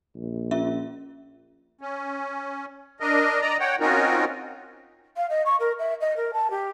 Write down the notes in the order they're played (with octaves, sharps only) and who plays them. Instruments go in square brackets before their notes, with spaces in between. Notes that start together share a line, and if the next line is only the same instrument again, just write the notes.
[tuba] A#1
[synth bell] C#4 F4 E5
[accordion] C#4
D4 A#4 D#5
D5 D#5 A#5
C#5 F#5 G5
C4 C#4 D#4 F4 F#4 A#4
[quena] F5
D#5
C#6
A#4
E5
D#5
A#4
A5
G4